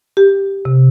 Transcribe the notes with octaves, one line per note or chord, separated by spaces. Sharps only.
G4
C3